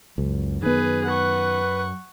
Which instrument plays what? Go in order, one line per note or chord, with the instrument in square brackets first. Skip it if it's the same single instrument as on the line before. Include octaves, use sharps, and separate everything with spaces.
[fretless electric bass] C#2 [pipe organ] F#2
[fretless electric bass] D#3 B3 [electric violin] G#4 B4
[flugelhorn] B4 [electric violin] F#5 C#6